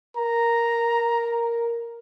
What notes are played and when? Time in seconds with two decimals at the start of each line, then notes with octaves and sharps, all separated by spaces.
0.17 A#4 A#5